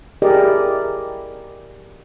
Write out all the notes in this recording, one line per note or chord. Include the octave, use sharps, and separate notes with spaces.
E4 G4 G#4 A#4 D5 D#5